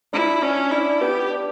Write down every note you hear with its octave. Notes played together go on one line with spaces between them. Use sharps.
D4 E4
C#4 D4
D4 E4
B3 G4
D4